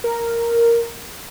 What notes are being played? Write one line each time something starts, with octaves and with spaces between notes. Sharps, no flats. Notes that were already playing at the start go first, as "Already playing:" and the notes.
A#4